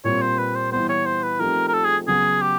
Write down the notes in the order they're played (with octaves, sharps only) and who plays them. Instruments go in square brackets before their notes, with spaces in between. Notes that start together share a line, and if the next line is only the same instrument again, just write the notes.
[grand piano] A#2 G3 C4 F4 [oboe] C#5
[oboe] C5
B4
C5
[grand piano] E3 G3 B3 [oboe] C5
[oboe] C#5
C5
B4
[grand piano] F3 A3 C4 D#4 G4 [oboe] A#4
[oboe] A#4
A4
G#4
[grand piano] C#3 F#3 B3 [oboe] G#4
[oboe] G4